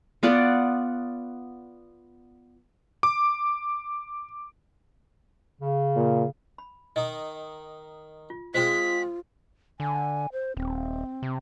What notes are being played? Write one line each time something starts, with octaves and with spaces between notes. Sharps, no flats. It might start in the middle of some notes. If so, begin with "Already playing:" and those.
B3 F4 D5 F#5
D6
C#3
A#2
B5
D#3 D#4 D#5
F4
G#3 C4 F4 G#4 C5 B6
D3 G#5
C5
D#1 C4
C3